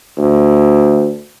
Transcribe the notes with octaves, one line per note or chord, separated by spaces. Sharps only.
D2